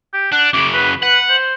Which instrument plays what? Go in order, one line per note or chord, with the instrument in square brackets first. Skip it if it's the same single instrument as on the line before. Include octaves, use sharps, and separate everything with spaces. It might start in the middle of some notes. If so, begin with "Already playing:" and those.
[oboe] G4
[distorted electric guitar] D4 [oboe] F#5
[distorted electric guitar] F#2 C#3 [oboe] D6
[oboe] B4
[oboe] B4 [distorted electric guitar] F#5
[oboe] C5